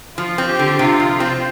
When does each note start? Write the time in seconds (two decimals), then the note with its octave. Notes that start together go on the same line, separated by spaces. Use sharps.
0.18 F3 F4
0.38 C4
0.49 G4
0.59 D3
0.79 C3 F4
1.00 F3
1.20 C4